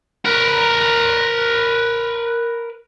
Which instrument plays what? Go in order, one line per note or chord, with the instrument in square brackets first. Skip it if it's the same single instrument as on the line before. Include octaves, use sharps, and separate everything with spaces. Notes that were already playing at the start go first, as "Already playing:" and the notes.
[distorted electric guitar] A#4 B4